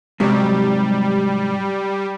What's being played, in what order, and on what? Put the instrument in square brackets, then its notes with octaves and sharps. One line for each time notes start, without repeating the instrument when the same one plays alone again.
[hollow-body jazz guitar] G#2 C3 F#3 [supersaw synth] G3